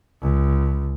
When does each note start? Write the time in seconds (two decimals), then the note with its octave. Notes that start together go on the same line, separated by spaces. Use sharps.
0.22 C#2